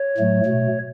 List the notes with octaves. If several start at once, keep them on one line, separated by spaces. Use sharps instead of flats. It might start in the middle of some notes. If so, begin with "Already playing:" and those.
Already playing: C#5
A2 F#3 A3
B2 A3